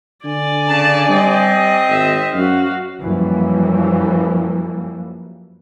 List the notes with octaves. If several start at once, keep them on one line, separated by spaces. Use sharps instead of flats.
D3 D5 G#5
C#3 A5
G3 C4 D#5
G#1 E5
F#2 F#4 F5
F#2 E3 F3 G3 A#3